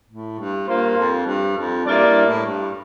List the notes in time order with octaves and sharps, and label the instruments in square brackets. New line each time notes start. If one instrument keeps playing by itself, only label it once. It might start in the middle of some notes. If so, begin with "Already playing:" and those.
[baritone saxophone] A2
G2
[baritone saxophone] G2 [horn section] A#3 F4 C5
[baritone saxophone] F2
G2
F2
[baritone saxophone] G2 [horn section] A#3 E4 A#4 D5
[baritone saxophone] G2
A2
G2